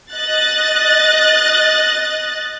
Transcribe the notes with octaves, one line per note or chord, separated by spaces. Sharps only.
D#5 F#6 A6